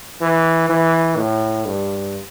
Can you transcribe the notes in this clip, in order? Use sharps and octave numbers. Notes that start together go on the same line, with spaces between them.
E3
E3
A2
G2